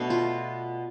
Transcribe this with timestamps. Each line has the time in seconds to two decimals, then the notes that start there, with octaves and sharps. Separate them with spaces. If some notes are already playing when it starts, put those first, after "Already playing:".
Already playing: B2 A3 D4
0.10 F4